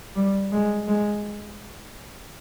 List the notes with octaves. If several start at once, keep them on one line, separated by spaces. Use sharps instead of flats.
G3
G#3
G#3